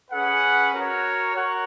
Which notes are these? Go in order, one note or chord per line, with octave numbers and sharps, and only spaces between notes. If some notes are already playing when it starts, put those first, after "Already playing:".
C#4 G#4 B4 F#5
F#4 A#4 C#5
F#4 A#4 C#5 F#5